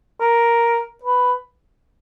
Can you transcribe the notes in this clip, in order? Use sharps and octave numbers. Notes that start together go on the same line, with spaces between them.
A#4
B4